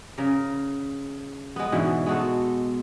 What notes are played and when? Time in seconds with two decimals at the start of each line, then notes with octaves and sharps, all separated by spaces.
0.18 C#3 A#4
1.56 G#3 B3
1.72 G#2 B2 D3 E3
2.06 G#3 B3 F#4 A4